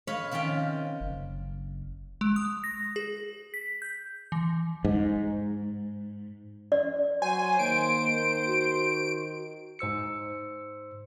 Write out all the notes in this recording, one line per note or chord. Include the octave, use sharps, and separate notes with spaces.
B4 C#5 D#5 F5 B5
C3 D#3 F3 C#4 G5
F#1
G#3
D#6
A#6
G#4
B6
G6
E3
G#2
D5
F#3 C5 G#5
D#3 A#3 D7
F#4
G#2 C5 E6 C#7